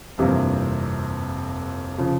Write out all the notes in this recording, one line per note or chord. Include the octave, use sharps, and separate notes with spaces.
G1 F2 C3 E3 A#3
C#3 F3